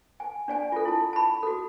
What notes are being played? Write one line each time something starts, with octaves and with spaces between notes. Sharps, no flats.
G#5
D4 D5 G#5
F4 A4
E4 A5
A5 B5
F#4 A4